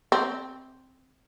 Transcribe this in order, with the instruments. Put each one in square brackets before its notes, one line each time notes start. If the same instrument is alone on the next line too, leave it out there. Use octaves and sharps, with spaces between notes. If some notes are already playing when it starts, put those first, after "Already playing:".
[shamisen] C4